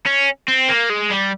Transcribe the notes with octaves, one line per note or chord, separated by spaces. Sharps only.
C#4
C4
A#3
G#3
G3